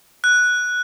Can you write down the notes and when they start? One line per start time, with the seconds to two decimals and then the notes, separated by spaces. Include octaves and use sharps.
0.24 F#6